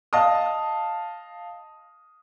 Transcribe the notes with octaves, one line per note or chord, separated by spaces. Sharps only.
D#5 F5 A5 D#6